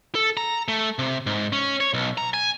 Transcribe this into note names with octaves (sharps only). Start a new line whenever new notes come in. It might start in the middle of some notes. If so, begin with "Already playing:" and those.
A4
A#5
A3
C3
G#2
C#4
C#5
B1
A#5
G#5